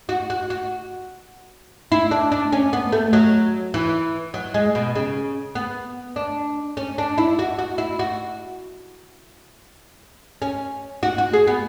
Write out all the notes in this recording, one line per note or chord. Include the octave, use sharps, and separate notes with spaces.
F#4
F#4
F#4
E4
D4
D4
C#4
B3
A3
F#3
E3
F#3
G#3
B2
C#3
B3
D4
C#4
D4
E4
F#4
F#4
E4
F#4
C#4
F#4
F#4
G#4
B3